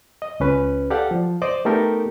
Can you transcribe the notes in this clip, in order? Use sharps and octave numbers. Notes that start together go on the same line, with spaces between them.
D#5
C#2 C#4 B4
G4 A4 D5 F5 F#5
F3
C5 D5 D#5 D6
A3 B3 D#4 G4 A4 A#4